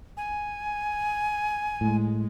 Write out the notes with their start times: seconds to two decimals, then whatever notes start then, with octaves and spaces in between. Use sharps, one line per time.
0.17 G#5
1.81 A2 G#3